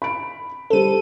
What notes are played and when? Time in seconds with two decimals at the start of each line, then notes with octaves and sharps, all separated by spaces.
0.02 B5 D7
0.70 G3 A4 C5 D#7